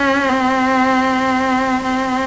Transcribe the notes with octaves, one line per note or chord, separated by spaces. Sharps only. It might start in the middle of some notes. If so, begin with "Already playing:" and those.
Already playing: C#4
C4
C4